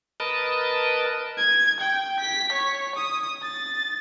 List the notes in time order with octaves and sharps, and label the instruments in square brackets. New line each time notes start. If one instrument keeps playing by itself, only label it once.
[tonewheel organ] A#4 B4 D#5 A5
[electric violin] G#6
G5
B6
C#5
D#6
A6